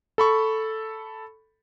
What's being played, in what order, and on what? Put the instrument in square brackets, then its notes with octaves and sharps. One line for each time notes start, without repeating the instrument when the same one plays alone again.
[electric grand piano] A4 B5 C#6